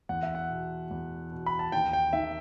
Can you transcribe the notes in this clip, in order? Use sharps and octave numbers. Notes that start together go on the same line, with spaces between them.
E2 F#5
E5
F#5
B2
E2
B2
B5
A5
D#2 G5
G5
D#3 E5